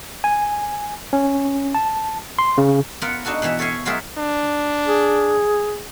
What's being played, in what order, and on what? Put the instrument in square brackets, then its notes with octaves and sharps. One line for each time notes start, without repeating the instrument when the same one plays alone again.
[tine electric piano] G#5
C#4
A5
C6
C#3
[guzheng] B3 F4 A#4 F#5
D4 D#4 F#4 A4
B2 E3 B3 E5
A4 C#5 E5 F5 G#5
F#3 F4 F#4 G#4 A#4 E5
[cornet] D4
[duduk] G#4